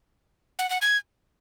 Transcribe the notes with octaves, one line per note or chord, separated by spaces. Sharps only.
F#5
F#5
G#6